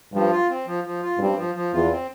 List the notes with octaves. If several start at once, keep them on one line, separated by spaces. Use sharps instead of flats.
G2 F3
F4
C4
F3
F3
F4
G2 C4
F3
F3
E2 F4
C4